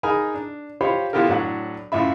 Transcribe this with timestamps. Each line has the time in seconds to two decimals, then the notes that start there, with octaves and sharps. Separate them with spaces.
0.03 D#4 G#4 A#4 G#5 A#5 B5
0.34 D4
0.81 F4 G4 C5 C#5 B5
1.13 B3 E4 F4 G4 A4 A#4
1.29 A2 F#3 D4 F#5
1.92 F#2 A2 F4 E5 B5